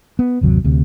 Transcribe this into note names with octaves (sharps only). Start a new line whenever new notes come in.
B3
G1 D#2 C3 F#3
D2 C3